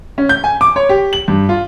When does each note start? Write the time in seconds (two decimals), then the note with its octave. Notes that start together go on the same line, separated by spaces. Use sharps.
0.18 C#4
0.29 G6
0.44 G#5
0.61 D6
0.76 C#5
0.89 G4
1.13 F#7
1.28 G2
1.49 F4